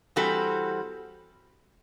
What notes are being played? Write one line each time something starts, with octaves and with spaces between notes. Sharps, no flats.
E3 G3 C4 F#4 A4